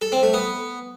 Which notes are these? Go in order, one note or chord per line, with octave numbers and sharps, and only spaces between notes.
A4
C4
A3
B3